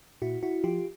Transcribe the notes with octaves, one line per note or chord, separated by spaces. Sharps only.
A#2 E4 F#4
E4 F#4
F3 F4 G4